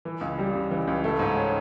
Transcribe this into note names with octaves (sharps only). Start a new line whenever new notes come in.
E3
C#2
G3
C#3
E3
C#2
A3
G#2
C#4